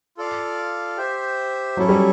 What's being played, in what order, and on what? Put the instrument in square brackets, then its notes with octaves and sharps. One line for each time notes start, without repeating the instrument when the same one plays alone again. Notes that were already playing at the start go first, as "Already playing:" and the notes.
[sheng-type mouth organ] F4 A4 D5 F5
G4 C5 E5
[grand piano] F#3 [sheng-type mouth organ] C#4 E4 A4
[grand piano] G3